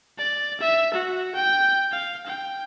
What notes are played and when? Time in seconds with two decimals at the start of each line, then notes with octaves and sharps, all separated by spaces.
0.18 D5
0.61 E5
0.94 F#4
1.35 G5
1.92 F5
2.26 G5